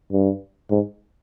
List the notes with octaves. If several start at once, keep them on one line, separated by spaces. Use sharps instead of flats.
G2
G#2